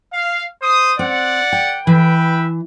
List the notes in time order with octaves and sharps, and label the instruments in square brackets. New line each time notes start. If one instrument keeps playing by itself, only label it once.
[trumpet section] F5
C5 D#6
[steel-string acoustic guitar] C4 [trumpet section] D5 F#5
[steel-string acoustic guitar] G5
[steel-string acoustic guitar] E3 [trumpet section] B4 E5 G5